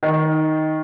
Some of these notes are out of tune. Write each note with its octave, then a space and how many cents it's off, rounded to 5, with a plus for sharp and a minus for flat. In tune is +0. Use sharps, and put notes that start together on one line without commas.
D#3 +5